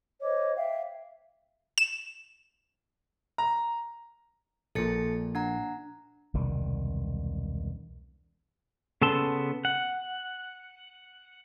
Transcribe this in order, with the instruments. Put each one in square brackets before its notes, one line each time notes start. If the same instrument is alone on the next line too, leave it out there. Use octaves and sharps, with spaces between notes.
[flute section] C5 C#5 D#5 D6
E5 F5 G5
[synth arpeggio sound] E7
[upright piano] A#5
[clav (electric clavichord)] A#1 A#2 [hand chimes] A4 A6 C#7
[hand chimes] D4 F#5 A#5
[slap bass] E1 C2 D#3 G3
[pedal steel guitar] C#3 B3 A4 A5 C6
F#5